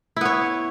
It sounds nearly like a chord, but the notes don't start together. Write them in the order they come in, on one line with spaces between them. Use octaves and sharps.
E4 B3 C#5